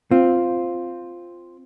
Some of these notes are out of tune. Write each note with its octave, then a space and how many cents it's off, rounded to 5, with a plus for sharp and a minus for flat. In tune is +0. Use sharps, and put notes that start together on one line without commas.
C4 +0 F4 +0